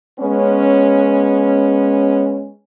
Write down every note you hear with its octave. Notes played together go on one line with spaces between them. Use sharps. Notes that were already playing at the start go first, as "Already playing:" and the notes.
G#3 B3 C#4